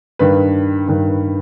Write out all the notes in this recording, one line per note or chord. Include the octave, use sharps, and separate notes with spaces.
G2 D#3 B4
G2 D#3